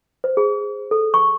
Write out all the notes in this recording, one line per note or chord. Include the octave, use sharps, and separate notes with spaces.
C5
G#4
A4
C#6